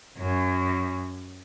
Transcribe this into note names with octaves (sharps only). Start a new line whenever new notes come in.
F#2